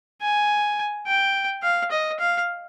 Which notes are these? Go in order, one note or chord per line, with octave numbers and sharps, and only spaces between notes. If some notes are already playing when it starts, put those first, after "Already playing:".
G#5
G5
F5
D#5
F5